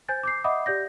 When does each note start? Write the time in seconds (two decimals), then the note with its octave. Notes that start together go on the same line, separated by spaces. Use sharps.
0.08 C5 G#5 G6 A6
0.23 D6 G6 C7
0.44 D#5 E5 F#5 B5 D6 D#6
0.66 G4 D5 G6 A#6